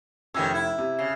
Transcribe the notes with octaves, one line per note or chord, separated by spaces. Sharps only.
F1 D#3 E3 C#4 G4 E6
E4
C3
C#3